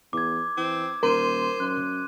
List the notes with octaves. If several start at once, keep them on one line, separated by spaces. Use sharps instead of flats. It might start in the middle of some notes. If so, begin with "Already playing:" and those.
E2 D6 G#6
E3 C4
D#1 A#4 C5 C6 D#7
F#2 F#6